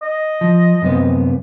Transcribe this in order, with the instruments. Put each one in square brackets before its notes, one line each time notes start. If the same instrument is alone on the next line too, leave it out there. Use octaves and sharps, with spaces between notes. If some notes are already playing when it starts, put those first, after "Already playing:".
[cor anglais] D#5
[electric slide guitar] F3
F#2 C3 B3